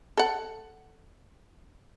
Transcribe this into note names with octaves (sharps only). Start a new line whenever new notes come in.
A4 F#5